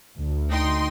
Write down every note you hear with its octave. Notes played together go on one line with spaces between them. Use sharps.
D2
D#4 G5 C6